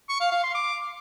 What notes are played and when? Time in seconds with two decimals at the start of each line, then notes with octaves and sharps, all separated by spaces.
0.09 C#6
0.20 F5
0.32 F5
0.43 C6
0.55 D6